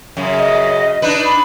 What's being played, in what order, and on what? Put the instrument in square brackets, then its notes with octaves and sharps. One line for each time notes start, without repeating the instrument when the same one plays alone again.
[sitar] F#2 C#3
[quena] D#5
[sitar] D4 D#4 B4
[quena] B5